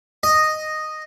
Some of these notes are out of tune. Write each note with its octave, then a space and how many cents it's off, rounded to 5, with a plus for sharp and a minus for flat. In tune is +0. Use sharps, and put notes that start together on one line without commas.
D#5 -5